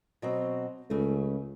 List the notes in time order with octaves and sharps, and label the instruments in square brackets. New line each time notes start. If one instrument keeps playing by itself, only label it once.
[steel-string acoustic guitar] B2 F#3 C4
[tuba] C#2 [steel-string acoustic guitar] C#3 A3